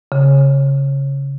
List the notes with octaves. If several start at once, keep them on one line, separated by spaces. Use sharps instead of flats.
C#3